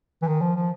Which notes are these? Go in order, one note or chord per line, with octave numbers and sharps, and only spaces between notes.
E3
D#3
F3
F3